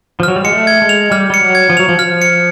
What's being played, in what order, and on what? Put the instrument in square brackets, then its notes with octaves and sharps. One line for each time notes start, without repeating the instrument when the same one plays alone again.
[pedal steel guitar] F3
[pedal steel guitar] F#3 [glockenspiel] F6
[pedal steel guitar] G3
[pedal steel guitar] G#3 [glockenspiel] C#7
[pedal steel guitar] A3
[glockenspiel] G#6
[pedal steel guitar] G#3
[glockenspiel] F7
[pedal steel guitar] G3 [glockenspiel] F6
[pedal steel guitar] G3 [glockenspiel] C#7
[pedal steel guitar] F#3
[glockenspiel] G#6
[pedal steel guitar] F3
[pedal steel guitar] F#3 [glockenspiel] F7
[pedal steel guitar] F3
[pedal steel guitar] F3 [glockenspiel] F6
[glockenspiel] C#7